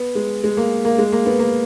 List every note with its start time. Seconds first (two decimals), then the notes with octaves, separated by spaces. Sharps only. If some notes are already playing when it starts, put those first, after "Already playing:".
Already playing: B3
0.15 G#3
0.44 G#3
0.57 A#3
0.85 A#3
0.98 G#3
1.12 A#3
1.26 B3
1.39 A#3